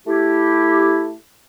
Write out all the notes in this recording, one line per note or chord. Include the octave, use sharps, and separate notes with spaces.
A3 E4 G4